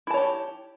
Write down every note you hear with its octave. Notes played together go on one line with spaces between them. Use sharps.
E4 G4 C#5 A5